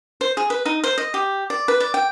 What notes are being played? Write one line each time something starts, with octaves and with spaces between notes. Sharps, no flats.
C5
G#4
B4
D#4
C5
D#5
G4
D5
B4
D5
G5